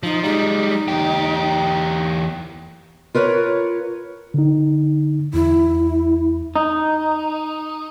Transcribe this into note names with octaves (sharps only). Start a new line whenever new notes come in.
F3 D#4
G3 G#3 D#4
E2 G4
F4 A#4 B4 C#5
D3 D#4
E2 E4
D#4